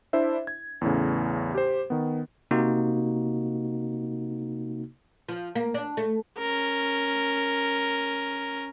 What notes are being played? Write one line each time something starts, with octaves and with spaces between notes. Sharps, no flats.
D4 E4 C5 E5
G#6
E2 A2 C#3
G4 C5
D#3 B3
C3 A#3 D#4 F#4
F3
A#3
D4
A3
C#4 A#4